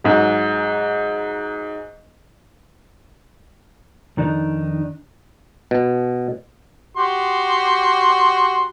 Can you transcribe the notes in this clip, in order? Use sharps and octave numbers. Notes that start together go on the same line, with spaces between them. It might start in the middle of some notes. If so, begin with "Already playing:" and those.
G#2 F#3
F2 D#3 D4 D#4
B2
F#4 G4 C6